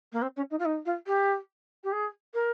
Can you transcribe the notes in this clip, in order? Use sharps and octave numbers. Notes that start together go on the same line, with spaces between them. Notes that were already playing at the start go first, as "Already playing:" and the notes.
A#3
C4
C#4
D#4
F4
D#4
F4
G4
G4
G#4
A#4